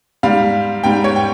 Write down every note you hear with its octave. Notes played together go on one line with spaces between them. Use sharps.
G#2 G3 F5
G#2 G3 G5
C#5
G5